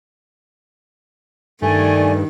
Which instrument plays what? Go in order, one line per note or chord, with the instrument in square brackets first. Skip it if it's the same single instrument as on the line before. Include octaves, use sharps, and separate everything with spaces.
[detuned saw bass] G2 [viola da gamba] D#3 [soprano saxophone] A3 [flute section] D5 G#5